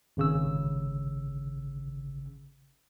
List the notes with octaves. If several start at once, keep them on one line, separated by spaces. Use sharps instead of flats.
G#1 C#3 E6